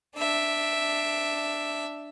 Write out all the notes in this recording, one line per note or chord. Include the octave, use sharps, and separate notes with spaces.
D4 E5